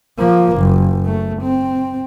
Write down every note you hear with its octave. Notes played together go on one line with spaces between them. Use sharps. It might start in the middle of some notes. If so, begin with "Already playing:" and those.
F3 A#3
F#1
A3
C4